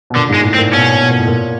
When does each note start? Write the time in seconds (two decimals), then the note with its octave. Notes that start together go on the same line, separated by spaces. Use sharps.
0.10 B2
0.16 A#2 D3
0.29 G#2 G#3
0.44 A2
0.54 C4
0.58 A#2
0.73 B2 C#4
1.02 B2
1.10 A#2
1.19 A2
1.27 A#2